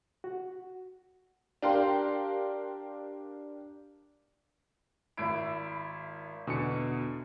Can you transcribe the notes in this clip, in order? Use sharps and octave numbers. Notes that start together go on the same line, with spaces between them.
F#4
D4 G4 A#4 F5 G5 C6
G#1 E4 D7
E2 B2 D3 E3 C#7